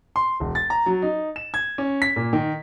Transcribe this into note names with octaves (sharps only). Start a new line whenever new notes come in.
C6
E1
A6
A#5
F#3
D#4
E7
G#6
C#4
B6
A#2
D#3